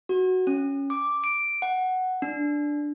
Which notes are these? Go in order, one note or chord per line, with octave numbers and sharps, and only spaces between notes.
F#4
C#4
D6
D7
F#5
D4